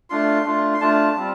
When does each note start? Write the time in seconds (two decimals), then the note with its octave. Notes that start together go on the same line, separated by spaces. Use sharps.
0.10 A3 D4 F4 C6
0.45 A3 D4 F4
0.74 C6
0.81 A3 D4 F4 A5
1.16 G3 C4 F4